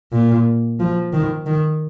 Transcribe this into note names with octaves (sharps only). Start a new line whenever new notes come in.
A#2
F3
D#3
D#3